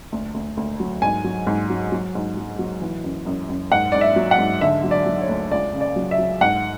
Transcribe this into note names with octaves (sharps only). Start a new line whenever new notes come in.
D2
D2
D2
F#3
G#2 G#5
F#3
G#2
F#3
F#3
G#2
F#3
F#3
E3
F#2
F#2
F#2
G#2 F#5
G#2 D5
E5
F#3
F#5
G#2
D3 E5
F#3
D5
F#3
C#5
D2
C#2 D5
C#3
D5
F#3
E5
F#3
G#2 F#5